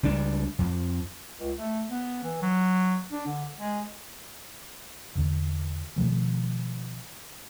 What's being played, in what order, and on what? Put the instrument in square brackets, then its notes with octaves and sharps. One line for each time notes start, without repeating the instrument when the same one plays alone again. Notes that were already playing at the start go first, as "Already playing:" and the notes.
[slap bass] C#2 G3 D4
F2
[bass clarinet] C#2
A3
B3
E3
F#3
D4
D3
G#3
[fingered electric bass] E2 D3
B2 D#3 F3 A3